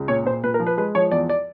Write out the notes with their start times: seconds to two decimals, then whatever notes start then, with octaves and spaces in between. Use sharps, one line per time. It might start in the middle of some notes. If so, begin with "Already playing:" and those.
Already playing: C#2
0.08 A#2 C#5
0.25 A#2 C5
0.44 A#2 B4
0.54 A#4
0.60 F3
0.67 B4
0.77 G#3 B4
0.95 F3 C#5
1.11 E2 D5
1.29 D5